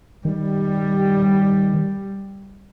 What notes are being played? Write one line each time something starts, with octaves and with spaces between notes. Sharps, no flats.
D#3 G3